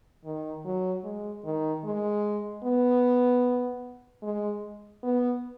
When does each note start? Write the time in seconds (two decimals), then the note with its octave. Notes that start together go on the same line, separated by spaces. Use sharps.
0.25 D#3
0.65 F#3
1.04 G#3
1.45 D#3
1.84 G#3
2.64 B3
4.23 G#3
5.03 B3